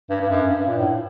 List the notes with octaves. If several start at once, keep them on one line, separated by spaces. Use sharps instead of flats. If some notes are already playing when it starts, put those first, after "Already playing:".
G2
G2
F#2
G2
A#2
A2